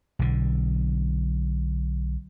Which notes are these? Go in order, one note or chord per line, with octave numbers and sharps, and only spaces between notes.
B1 D3